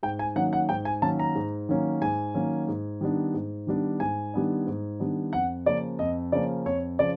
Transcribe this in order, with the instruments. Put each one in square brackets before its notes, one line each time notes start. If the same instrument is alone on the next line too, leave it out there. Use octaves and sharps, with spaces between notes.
[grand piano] G#2 G5
G#5
D#3 F#3 A#3 C#4 F#5
F#5
G#2 G5
G#5
D#3 F#3 A#3 C#4 A5
A#5
G#2
D#3 F#3 A#3 C#4
G#2 G#5
D#3 F#3 A#3 C#4
G#2
D#3 G3 B3 D4
G#2
D#3 G3 B3 D4
G#2 G#5
D#3 G3 B3 D4
G#2
D#3 G3 B3 D4
F2 F#5
C#3 F3 A#3 C#4 D5
F2 D#5
C#3 F3 A#3 C#4 D5
F2 C#5
C#3 F3 D5